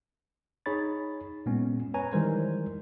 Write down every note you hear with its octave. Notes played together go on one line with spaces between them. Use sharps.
D#4 G#4 C#5 B5 A6
A#2 G#3 B3 C#4
B4 C#5 G#5 A#5
D#3 E3 G3 G#3 A#4 C5